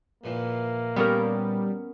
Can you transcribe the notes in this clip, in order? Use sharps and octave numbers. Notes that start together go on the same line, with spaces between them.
A#1 A#2 E3 A#3
G3 B3 C#4 A#4